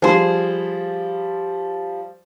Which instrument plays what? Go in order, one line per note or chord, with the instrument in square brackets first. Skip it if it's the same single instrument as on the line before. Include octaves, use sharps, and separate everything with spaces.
[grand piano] F3 G3 [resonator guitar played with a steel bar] G#4 C5